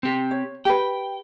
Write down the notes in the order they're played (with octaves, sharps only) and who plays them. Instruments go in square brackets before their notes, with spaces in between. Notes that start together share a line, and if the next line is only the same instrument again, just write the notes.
[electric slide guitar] C4 G4
[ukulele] C#5
[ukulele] G4 B4 [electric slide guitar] G5